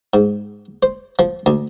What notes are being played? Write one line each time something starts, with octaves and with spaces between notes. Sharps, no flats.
G#2
C5
F3
D2